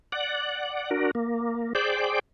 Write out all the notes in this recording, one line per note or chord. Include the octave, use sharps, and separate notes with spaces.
D5 F#5
D4 F#4 A#4
A#3
G#4 C5 D5 G5 D6